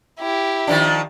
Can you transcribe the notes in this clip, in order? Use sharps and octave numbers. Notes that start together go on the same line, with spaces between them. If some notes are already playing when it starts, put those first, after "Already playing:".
E4 G4
D#3 F3 D4